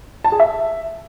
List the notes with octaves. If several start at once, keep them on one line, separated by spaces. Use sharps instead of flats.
A5
G#4
E5